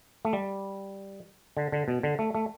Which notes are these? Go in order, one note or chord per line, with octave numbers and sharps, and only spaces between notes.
A3
G3
D3
D3
B2
D3
A3
A3